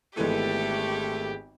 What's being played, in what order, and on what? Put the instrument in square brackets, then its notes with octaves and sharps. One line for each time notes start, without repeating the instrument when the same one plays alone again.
[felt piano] G#1 B3 D#7 [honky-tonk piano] E3 G#3 [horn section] A3 [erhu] G4